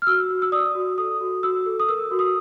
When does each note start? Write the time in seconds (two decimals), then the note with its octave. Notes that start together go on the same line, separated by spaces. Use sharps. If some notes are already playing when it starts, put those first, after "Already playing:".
0.02 F6
0.07 F#4 E6
0.30 F#4
0.42 E6
0.52 D5 D#6
0.75 F#4
0.98 A4 D#6
1.21 F#4
1.43 F#4 E6
1.66 A4
1.80 D#6
1.89 A#4 E6
2.11 F#4
2.19 D#6